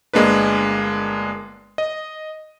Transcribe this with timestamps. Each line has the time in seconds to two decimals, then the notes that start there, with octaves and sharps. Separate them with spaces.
0.13 G1 G#3 A#3 D4 B4
1.78 D#5